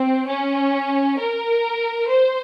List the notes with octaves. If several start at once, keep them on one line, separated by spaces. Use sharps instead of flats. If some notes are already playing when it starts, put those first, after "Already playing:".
Already playing: C4
C#4
A#4
C5